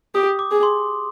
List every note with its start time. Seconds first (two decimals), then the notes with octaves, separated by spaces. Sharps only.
0.15 G4 D#6
0.39 D6
0.51 G#4
0.63 C6